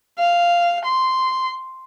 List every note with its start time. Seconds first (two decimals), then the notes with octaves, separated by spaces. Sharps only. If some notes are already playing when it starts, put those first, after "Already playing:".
0.19 F5
0.85 C6